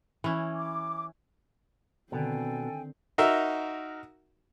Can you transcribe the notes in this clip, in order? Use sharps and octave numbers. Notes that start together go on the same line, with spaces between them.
E3 C#4
D6
B2 D3 D#3 C4 A4 D5 G5 G#5
D#4 F#4 A#4 E5